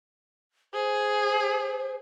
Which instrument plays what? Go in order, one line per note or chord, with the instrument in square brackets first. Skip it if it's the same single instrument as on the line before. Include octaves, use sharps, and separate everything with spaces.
[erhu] G#4 [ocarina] C5